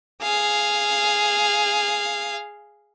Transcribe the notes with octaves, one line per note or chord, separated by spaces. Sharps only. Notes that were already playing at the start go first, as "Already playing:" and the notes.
G#4 F5